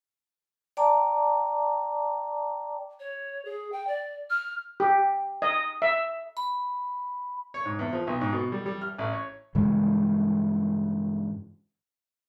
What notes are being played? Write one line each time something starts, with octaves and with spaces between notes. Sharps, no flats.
D5 G5 A5 A#5 D6
C#5
G#4
G5
D5
F6
G4
D#5
E5
B5
C#5
G#2
E2
F3
B1
G#2
B2
G3
G3
F6
A1
C#5
G2 C#3 E3 G#3